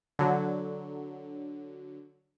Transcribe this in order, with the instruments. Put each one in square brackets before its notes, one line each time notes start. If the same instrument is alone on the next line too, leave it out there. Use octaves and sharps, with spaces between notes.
[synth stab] D3 F#3